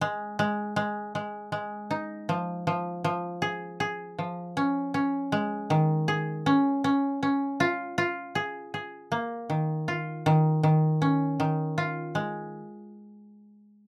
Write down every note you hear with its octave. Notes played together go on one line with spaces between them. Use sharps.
G#3
G#3
G#3
G#3
G#3
D#4
F3
F3
F3
G#4
G#4
F3
C#4
C#4
G#3
D#3
G#4
C#4
C#4
C#4
F4
F4
G#4
G#4
A#3
D#3
F4
D#3
D#3
C#4
D#3
F4
G#3